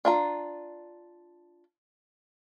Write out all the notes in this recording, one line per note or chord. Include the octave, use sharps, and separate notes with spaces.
D4 F4 A#5